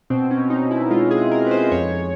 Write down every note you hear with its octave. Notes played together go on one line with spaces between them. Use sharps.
B2 C4
C#4
B2
D#4
B2
E4
G#3 F4
G#4
G#3
A#4
G#3 B4
C5
F2 C#5